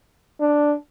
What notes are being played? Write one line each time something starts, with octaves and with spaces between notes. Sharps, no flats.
D4